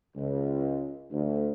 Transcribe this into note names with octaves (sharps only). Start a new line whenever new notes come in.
C#2
D2